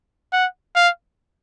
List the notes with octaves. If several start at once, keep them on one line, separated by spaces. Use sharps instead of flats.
F#5
F5